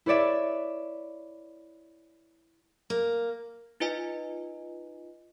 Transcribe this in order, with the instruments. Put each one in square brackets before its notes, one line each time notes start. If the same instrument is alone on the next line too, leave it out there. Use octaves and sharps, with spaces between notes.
[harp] E4 B4 C#5 D5 E5
[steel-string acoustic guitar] A#3
[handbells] D#4 F4 B4 D#5 G#5